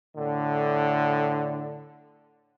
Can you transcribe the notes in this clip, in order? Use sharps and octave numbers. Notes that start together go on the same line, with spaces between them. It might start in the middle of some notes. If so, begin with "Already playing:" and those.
A2 D3